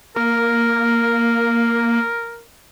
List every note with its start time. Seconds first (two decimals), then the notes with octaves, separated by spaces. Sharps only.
0.16 A#3 A#4